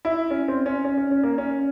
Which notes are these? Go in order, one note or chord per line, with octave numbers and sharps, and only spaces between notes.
E4
C#4
C4
C#4
C#4
C#4
C#4
A#3
C#4